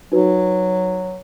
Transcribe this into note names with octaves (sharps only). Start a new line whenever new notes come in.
F#3 D#4 F#4 B4